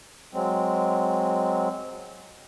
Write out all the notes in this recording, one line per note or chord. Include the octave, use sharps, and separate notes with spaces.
F#3 G#3 C4